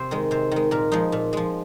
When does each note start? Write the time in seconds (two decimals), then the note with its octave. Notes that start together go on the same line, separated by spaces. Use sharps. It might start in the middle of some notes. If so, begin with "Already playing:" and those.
Already playing: C3 C5
0.11 D#3 G#3
0.31 C3 C5
0.51 D#3 G#3
0.71 A#2 A#4
0.92 F3 G#3 D#4
1.12 A#2
1.33 F3 G#3